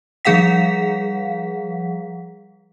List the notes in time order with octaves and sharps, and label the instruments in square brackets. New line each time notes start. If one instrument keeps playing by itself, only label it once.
[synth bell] F3 G3 G#4 F5 F#5 B6